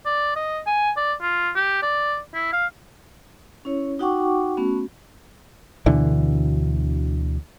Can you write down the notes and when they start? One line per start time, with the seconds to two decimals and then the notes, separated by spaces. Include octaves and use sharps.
0.05 D5
0.35 D#5
0.66 G#5
0.96 D5
1.21 F4
1.56 G4
1.82 D5
2.34 E4
2.53 F5
3.65 C#4 E4 C#5
3.99 D#4 F#4 F#5 G5 C#6 D6
4.57 A3 B3 C#4 F#4
5.86 D2 B2 D3 E3